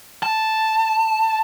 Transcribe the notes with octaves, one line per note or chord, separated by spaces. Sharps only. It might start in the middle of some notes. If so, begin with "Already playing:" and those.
A5